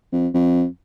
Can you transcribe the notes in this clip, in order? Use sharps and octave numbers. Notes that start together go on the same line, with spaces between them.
F2
F2